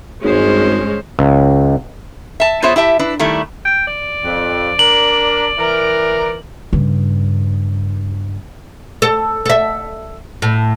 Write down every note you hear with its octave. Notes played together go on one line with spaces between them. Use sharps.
G#1 G2 G#3 C#4 C5
C#2
E5 A5
B3 F4 G#4 C5 C#5 E5
E4 G4 E5 A5
D4 E4 B4
D#3 G3 A3 D4 E4
G5
D5
F2
D4 A#4 F#7
E3 A#4
G2 C#3
A4
A4 E5
A2